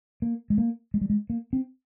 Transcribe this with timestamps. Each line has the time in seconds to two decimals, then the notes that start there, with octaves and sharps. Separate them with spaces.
0.22 A#3
0.50 G#3
0.58 A#3
0.94 G#3
1.01 G3
1.10 G#3
1.30 A#3
1.53 C4